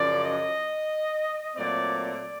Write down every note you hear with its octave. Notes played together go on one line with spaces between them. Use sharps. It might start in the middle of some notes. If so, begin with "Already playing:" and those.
Already playing: F#2 C#3 F3 D5
D#5
A#2 F#3 A3 C4 D5
D5